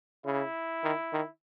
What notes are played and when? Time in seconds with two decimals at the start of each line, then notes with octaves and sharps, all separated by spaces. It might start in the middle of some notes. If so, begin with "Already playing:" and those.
0.25 C#3 E4
0.84 D#3
1.13 D#3